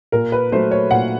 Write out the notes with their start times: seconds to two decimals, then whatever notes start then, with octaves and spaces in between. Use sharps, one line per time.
0.12 A#2 A#4
0.32 B4
0.52 F#3 A3 C5
0.71 C#5
0.91 A#2 F#5